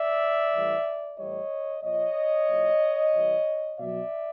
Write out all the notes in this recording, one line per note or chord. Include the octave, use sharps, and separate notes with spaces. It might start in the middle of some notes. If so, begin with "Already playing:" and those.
Already playing: D5 E5
A2 E3 G3
A2 E3 G3 C#5 D#5
A#2 F3 C#5 D#5
A2 F3
C3 E3 G3
B2 F#3 D5 E5